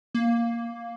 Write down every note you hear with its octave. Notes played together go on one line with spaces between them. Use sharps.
A#3